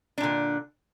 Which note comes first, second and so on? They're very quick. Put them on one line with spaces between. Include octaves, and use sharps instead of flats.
D4 A#2 D3